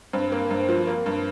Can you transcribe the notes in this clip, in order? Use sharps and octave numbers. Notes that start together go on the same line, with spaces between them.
G2 C4
A#3
G2
F3
A#3
G2